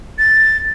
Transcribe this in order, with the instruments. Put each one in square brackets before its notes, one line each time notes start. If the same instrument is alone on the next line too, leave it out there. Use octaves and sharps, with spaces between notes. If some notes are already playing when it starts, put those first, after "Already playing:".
[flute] A6